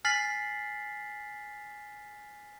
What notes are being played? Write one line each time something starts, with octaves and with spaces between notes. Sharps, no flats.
G#5 F6 A6 B6 C7 F#7